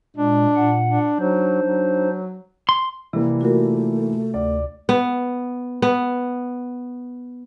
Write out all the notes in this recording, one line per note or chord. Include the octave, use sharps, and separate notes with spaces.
A#2 G#3 D4
A#2 F#5
D4
F#3 D4 D#4 C5
F#3
C6
C3 E3 G3 A#3
A3 F4 F#4 A#4
D2 D5
B3
B3